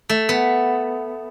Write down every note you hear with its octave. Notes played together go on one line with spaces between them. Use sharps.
A3
B3